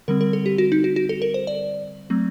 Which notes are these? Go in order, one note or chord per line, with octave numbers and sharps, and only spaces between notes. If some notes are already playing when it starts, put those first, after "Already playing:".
D3 G3 C4 A#4
A#4
A4
G4
F#4
D#4
F#4
F#4
A4
A#4
C5
D5
F#3 A3 C4